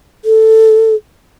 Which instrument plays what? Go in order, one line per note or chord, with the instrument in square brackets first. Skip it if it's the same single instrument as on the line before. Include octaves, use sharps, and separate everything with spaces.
[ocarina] A4